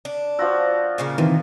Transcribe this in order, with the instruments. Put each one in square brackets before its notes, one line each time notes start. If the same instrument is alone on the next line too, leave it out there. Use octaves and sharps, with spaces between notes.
[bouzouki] D4
[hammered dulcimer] F3 F4 F#4 [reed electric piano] E6
[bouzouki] A#2 C#3 A#3
[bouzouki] A#2 [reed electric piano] D#3 E3 C4